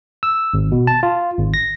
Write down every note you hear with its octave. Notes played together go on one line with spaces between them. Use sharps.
E6
G#1
B2
A5
F4
G#1
A#6